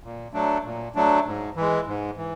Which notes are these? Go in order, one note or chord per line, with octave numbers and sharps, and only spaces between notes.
A#2
F#3 A3 D4
A#2
F#3 A3 D4
G#2
E3 G#3
G#2
E3